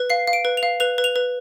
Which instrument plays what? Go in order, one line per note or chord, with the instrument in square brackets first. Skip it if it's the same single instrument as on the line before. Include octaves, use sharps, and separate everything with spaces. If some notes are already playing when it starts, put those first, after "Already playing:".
Already playing: [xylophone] B4
F5 C7
F5
D7
B4
F7
F5
B4 F7
B4
F7
B4